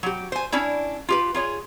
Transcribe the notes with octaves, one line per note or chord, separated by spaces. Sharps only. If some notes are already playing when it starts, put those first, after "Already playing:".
F#3 G4
C5 G#5
C#4 D4 E4
F4 G4 B4
F4 G#4 C#5